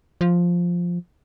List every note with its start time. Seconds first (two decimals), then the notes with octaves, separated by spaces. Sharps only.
0.21 F3